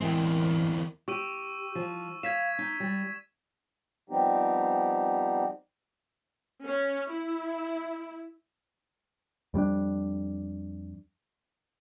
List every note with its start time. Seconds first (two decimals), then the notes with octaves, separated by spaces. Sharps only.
0.01 A1 E2 G#3 C4 E4 A#4 G5
1.08 G4 C#6 E6 D#7
1.75 F3
2.23 F5 G#6 B6 E7
2.59 D#4
2.80 G3
4.10 F3 G3 B3 C4 D#4 G4
6.64 C#4
7.09 E4
9.54 F2 G3 C4 D4